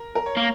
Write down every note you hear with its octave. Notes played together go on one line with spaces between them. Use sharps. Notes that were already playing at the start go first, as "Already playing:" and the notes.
Already playing: A#4
A#4
C#5
A#3